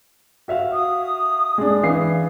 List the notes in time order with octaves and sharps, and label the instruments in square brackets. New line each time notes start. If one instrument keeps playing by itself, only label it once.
[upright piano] F#4 E5 F5
[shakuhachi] D#6
[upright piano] G#3 D4
E3 F5 C7